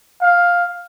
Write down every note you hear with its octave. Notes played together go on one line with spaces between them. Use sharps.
F5